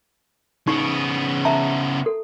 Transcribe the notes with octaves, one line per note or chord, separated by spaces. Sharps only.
C#3 B3 D#4 C#6
E5 A5 A#5
A4